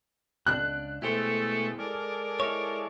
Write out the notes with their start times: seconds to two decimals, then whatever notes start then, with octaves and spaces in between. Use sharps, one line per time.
0.46 C#2 D4 F#6
1.02 B2 G#3 A3 E4 G4 A4 C5
1.79 G#3 A4 A#4 D5
2.40 D#4 E4 C#5